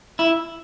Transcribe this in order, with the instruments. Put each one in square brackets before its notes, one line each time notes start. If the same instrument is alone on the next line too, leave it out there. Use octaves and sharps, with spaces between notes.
[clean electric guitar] E4